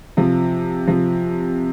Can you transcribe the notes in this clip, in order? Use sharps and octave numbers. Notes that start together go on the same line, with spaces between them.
C3 F3
C3 F3